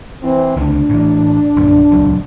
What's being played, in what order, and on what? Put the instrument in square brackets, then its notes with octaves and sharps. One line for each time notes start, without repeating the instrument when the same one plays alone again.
[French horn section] E3 C4
[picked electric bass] C#2 D3 [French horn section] D4
[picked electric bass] A2 E3
A#1 F#2 D3
D#1 C#2 F#3